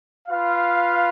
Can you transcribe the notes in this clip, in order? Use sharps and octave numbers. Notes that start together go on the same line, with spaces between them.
F4 B4 F5